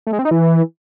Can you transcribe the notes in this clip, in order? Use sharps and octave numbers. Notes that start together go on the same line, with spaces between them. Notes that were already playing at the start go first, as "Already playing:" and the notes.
A3
G#3
C4
D#4
E3